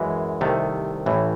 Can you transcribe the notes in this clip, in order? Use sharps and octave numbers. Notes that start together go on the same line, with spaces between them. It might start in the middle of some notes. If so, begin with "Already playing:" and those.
Already playing: F#2 E3 G#3
C2 C3 D#3 A3
A1 A2 E3